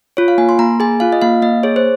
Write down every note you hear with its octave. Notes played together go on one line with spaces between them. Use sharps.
F4 C#5
F5
A#3 G#5
C6
A#3 A#5
G#4 G#5
F4 F5
D#5
A#3 F5
A#3 D#5
G#4 C#5
C5